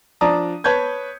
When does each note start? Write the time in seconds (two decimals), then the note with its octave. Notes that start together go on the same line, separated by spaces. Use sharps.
0.21 F3 D4 D5 A5 A#5 D#6
0.64 B4 C#5 A5 G6 G#6